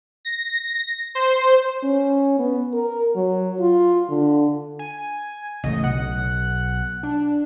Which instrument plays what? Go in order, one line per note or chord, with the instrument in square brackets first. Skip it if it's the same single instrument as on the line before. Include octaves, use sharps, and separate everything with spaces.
[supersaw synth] A#6
C5
[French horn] C#4
B3
A#4
F#3
F4
D3
[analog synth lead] G#5
[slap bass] A1 C#3 A3 [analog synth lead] D#5
[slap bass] B1 [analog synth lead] F#5
[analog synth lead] D4